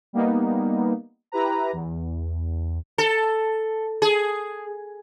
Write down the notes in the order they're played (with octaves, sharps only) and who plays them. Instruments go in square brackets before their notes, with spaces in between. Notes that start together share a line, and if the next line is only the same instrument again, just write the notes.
[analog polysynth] G3 A#3 B3 D#4
E4 G4 B4 A#5
E2
[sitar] A4
G#4